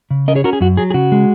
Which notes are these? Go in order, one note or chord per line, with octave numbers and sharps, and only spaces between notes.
C#3
C#4 A#4 D#5
G#4 C#5
C#4 F#4 A#4
G#4
F#2 F#4
F#3 G#4
G#4
C#3 F#4
G#3